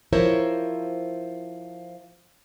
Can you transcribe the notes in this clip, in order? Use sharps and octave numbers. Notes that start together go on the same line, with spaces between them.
F3 E4 A#4 C5 C#5